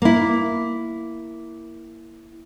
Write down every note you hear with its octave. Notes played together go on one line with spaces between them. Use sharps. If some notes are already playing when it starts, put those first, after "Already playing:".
A#3 E4